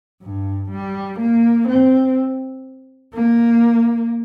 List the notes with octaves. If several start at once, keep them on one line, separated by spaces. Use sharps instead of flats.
G2
G3
A#3
C4
A#3